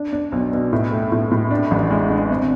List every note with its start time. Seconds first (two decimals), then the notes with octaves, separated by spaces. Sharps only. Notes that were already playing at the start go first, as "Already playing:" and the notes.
Already playing: D4
0.13 D4
0.32 B1
0.52 B2
0.73 A2
0.91 A3
1.12 A2
1.31 A2
1.51 D4
1.71 A1
1.91 G#3
2.10 D4
2.30 G#1